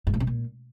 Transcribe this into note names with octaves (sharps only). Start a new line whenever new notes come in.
G#2
A2
C3
A#2